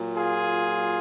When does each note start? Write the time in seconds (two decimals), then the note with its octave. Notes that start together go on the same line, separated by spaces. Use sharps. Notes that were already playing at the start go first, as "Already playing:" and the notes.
Already playing: A#2 F#3
0.16 F4 G#4